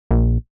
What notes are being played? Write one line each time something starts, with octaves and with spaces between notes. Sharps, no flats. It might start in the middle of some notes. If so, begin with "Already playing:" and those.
A#1